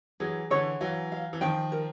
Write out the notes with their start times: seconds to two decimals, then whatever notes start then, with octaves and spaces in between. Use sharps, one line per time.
0.20 E3 F#3 G#4
0.50 D3 E3 C#5
0.81 E3 F#3 F5
1.12 F5
1.33 E3
1.41 D#3 F3 G5
1.72 A#4